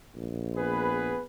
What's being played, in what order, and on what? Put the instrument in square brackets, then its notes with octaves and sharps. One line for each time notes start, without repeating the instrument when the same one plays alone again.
[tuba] A#1
[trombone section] B3 G#4 B4